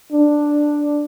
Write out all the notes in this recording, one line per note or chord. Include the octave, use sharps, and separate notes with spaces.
D4